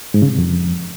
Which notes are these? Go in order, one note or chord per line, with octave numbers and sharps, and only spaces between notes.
G#2
C#3
C3
F2